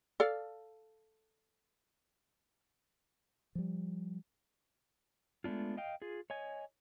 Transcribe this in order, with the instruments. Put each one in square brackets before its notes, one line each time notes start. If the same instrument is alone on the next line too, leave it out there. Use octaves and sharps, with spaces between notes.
[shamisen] A4 D5 F5
[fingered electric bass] F3 G3
[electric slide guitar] G#3 A3 B3 D4 F4
D#5 F5 G5
F4 G#4
C#5 D#5 G#5